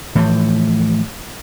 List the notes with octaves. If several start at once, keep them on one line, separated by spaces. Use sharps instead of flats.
A2 E3 F3